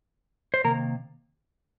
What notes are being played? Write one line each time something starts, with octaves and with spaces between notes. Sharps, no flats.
C5
C3 D#3 A#3 A#4